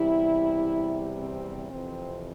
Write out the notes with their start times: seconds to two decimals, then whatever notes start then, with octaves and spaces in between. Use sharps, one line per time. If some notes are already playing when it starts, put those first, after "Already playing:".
Already playing: E2 C3 G3 E4
1.16 C4
1.69 F2 C3 E3 C4